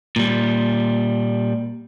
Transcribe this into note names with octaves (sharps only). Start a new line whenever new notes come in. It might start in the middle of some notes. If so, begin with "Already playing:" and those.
A#2 G3